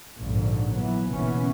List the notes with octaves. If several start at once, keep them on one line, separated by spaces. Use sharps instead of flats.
A#1 F2 G#2 D3
E3 F#3 B3
F#1 B2 E3 B3 C#4